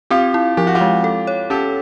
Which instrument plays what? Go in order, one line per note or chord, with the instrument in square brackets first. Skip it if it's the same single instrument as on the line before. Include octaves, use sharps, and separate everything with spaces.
[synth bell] C4 [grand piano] F4 G4
[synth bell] E4
[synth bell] F3 [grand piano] G4
[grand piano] F#4
F4 G4
[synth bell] G#3
A4
C#5
[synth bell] C#4 [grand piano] G4 A4